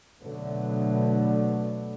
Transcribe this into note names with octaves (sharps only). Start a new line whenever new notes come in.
B2 D3 F#3 A3 B3